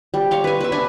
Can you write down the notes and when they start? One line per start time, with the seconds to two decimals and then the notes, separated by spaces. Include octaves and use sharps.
0.14 G3
0.31 C#5 F5 C6
0.44 B4 G#5
0.61 B4 E5
0.72 D4 B4 G#5